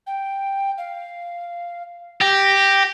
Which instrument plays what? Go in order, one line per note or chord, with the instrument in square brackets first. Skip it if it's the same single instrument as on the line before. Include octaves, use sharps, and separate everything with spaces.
[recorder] G5
F5
[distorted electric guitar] G4 [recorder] A#6